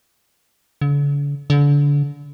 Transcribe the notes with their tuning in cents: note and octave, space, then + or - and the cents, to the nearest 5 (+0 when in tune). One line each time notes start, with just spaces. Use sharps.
D3 -45
D3 -30